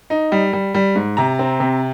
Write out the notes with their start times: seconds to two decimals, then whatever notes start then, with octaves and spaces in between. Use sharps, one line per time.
0.10 D#4
0.32 G3
0.53 G3
0.74 G3
0.96 G#2
1.17 C3 A#5
1.39 C4
1.60 C3